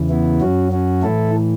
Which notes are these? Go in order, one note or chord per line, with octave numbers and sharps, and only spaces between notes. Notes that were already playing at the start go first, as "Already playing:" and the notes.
Already playing: E2 C#3 E3
B3 E4
F#2 F#3 C#4 F#4
C#4 F#4
A2 E3 E4 A4